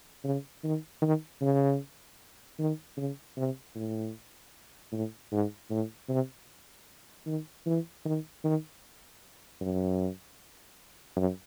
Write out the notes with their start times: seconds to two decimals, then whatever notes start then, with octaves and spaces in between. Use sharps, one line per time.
0.24 C#3
0.64 D#3
1.02 D#3
1.41 C#3
2.59 D#3
2.97 C#3
3.37 C3
3.75 A2
4.92 A2
5.32 G#2
5.70 A2
6.09 C3
7.26 D#3
7.66 E3
8.05 D#3
8.44 D#3
9.61 F#2
11.16 F#2